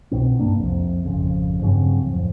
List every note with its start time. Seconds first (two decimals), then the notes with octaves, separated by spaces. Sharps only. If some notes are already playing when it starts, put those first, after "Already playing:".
0.11 C2 B2 C4
0.39 D1 G2 A#3 D4
0.58 C2 F2 C3
1.05 G#1 F2 C#3
1.62 G2 C#3 F#3 C4
2.01 D1 F2